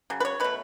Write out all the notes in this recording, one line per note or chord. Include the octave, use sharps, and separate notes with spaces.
C#3 F#3
B4
C#5
B2 A3 B4